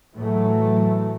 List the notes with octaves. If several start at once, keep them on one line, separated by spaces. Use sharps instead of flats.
A2 E3 F#3 A3